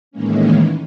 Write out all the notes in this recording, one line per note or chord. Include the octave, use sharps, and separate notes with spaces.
A2 D#3 E3 G#3 A#3 C#4